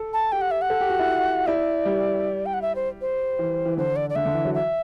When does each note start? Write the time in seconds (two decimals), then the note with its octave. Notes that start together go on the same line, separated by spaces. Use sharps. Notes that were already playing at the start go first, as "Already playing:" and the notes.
Already playing: A4
0.13 A5
0.32 G4 G5
0.41 F#5
0.51 E5
0.61 F#5
0.70 A4
0.80 G4
0.90 F#4
0.99 E4
1.47 E4 D5
1.85 G3
2.46 G5
2.54 F#5
2.62 E5
2.75 C5
3.01 C5
3.39 E3
3.66 E3
3.77 D3 C5
3.96 D5
4.10 D5
4.15 D3 E5
4.26 D3
4.34 E3
4.44 F#3
4.54 E5